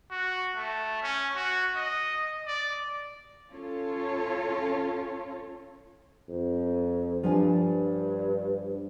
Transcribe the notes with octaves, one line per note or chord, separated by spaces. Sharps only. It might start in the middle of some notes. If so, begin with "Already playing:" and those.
F#4
A3
C#4
F#4
D#5
D5
C#4 F4 A4 C#5
F2
G2 F3 D4 G#5